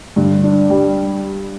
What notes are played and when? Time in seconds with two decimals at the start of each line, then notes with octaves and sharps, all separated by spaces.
0.16 G2 D3
0.44 D4
0.70 G3